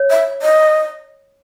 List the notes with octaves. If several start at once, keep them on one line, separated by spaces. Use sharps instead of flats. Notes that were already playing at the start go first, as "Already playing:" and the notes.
Already playing: C#5
E5
D#5